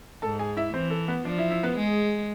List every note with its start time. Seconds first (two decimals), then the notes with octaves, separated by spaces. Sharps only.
0.22 G#2 A4 A5
0.39 G#4 G#5
0.57 E4 E5
0.74 E3 C4 C5
0.91 A4
1.08 B3 B4
1.25 F3 D4 D5
1.38 E4 E5
1.51 E4 E5
1.63 B3 B4
1.77 G#3 G#4